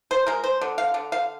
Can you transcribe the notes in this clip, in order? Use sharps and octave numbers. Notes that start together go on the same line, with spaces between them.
C5
G#3 A#4
C5
D3
F5
D3
F5